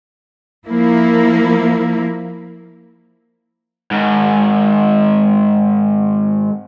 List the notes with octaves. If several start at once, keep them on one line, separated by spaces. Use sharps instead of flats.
F3 A#3 E4
G#2 D#3